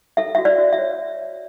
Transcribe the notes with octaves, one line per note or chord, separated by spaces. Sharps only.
A4 E5
F#4 E5
D5
F#4
E5
C#5